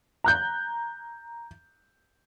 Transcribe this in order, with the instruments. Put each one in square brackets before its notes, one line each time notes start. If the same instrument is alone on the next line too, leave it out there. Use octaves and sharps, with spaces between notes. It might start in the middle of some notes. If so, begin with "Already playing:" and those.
[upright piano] A#5 F#6 G6